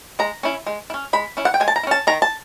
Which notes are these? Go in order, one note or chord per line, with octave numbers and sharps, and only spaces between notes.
G#3 A#5
C#4 E4
G#3
E4
C#4
G#3 B5
C#4 E4
F#5
G5
G#3 G#5
A5
A#5
E4
C#4 A5
D#3 A#5
A5